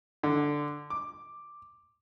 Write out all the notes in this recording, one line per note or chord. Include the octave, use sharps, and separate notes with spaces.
D3
D6